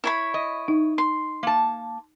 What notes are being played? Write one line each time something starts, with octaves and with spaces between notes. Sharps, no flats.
E4 C#5 B5
D#5
D#4
C6
A#3 A5